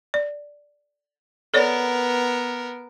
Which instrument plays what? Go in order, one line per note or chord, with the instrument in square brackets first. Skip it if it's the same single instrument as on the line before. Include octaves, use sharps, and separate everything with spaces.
[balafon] D5
[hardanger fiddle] B3 A#4 [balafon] A4 C#5 D5